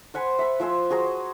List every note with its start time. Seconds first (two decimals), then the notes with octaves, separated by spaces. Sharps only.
0.14 C5 F#5 G#5 B5
0.39 E5 B5
0.60 F3 C5 G#5 E6
0.90 F#4 G#4 C5 A#5